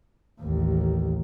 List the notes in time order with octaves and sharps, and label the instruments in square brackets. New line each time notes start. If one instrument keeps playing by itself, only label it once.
[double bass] A1 D#2